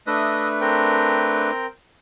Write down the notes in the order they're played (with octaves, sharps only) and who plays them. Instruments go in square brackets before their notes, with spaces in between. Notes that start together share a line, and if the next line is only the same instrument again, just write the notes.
[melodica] A3 D4 B4 [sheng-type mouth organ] D#5 E5 D#6
[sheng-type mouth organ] C4 A#4 G5